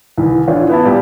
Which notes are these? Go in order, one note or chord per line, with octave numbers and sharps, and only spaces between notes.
C2 D#3 E3
A1 A2 D4 F4 C#5
B3 E4 A5
A#2 G3 G4